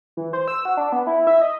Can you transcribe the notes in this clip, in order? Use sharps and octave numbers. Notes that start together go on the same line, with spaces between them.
E3
C5
E6
F#4
D4
B3
E4
E5
D#5